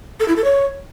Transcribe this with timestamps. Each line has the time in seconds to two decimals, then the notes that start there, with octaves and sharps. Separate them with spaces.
0.20 A4
0.28 E4
0.36 A4
0.44 C#5